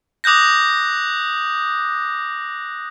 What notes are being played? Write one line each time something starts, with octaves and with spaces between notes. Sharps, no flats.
D6 D#6 F#6 G6 A#6